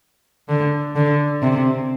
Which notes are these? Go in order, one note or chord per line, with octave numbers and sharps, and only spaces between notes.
D3
D3
C3